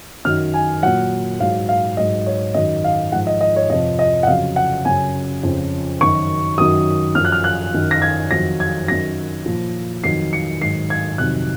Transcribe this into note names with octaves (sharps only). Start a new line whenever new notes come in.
F#2 D#3 F#3 F6
G#5
A#2 F#3 F#5
G#2 F#3 F5
F5
G#2 F#3 D#5
C#5
F#2 D#3 F#3 D#5
F5
G#2 F3 F#5
D#5
D#5
C#5
F2 C3 F3 D#5
D#5
F#5
F2 C#3 F#3 F5
F#5
F#2 C#3 F#3 G#5
F2 C#3 F3
F#2 D#3 F#3 C#6
F#2 D#3 F#3 D#6
F#2 F3 F6
F#6
F6
F#6
F#2 D#3 F#3
A#6
G#6
F2 D#3 F#3 A#6
G#6
F#2 D#3 F#3 A#6
A#2 F3
F2 D#3 F#3 C7
C#7
G#2 D#3 F#3 C7
G#6
F2 C3 D#3 F#3 F#6